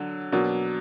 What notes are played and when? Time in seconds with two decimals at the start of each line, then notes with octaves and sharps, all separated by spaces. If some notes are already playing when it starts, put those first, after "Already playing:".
Already playing: D3 F#3
0.32 B2 F#3 A#3 D4